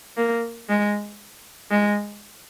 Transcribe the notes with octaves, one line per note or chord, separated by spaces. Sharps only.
A#3
G#3
G#3